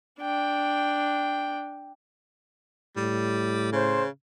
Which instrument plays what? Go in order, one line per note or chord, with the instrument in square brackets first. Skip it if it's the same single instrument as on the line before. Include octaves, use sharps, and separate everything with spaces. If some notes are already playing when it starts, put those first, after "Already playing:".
[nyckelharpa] D4 G5
[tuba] A2 [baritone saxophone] G3
[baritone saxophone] C#3 [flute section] C5